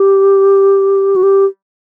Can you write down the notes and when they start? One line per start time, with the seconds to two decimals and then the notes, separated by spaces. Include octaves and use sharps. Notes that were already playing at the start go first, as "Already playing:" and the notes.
Already playing: G4
1.16 F#4
1.23 G4